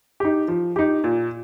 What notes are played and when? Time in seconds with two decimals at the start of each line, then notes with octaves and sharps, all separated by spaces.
0.20 D#4 G4
0.48 F3
0.76 D#4 G4
1.04 A#2